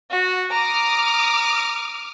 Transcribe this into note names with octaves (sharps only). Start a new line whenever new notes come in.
F#4
A#5 D6 D#6 F6